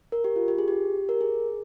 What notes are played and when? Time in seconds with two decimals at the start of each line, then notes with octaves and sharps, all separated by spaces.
0.12 A#4
0.24 G4
0.36 F4
0.48 G4
0.58 G#4
0.68 G4
1.09 A#4
1.21 G#4